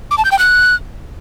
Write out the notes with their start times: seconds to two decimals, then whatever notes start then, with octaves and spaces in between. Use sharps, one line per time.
0.11 D6
0.18 A5
0.25 G6
0.32 G5
0.39 F#6